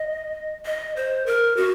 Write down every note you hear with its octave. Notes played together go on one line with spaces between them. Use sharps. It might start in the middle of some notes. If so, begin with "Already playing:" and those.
Already playing: D#5
D#5
C5
A#4
F#4